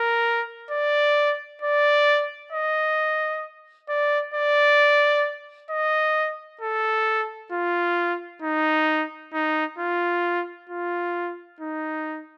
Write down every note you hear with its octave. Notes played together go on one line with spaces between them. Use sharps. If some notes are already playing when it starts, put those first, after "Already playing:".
Already playing: A#4
D5
D5
D#5
D5
D5
D#5
A4
F4
D#4
D#4
F4
F4
D#4